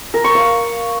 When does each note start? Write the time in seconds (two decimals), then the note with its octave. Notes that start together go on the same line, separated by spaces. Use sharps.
0.14 A#4
0.24 C#6
0.35 F5